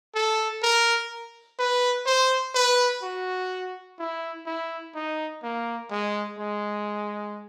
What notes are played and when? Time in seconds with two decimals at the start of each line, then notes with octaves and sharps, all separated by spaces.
0.15 A4
0.63 A#4
1.59 B4
2.06 C5
2.55 B4
3.03 F#4
3.99 E4
4.46 E4
4.95 D#4
5.43 A#3
5.91 G#3
6.39 G#3